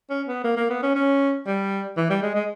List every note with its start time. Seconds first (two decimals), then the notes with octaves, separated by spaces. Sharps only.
0.10 C#4
0.28 B3
0.44 A#3
0.57 A#3
0.70 B3
0.83 C#4
0.96 C#4
1.46 G3
1.97 E3
2.10 G3
2.22 G#3
2.35 G#3